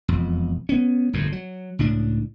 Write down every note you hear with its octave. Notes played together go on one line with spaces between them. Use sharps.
E1 F2
B3 C#4
G1 F2 A2
F#3
C#2 A2 D4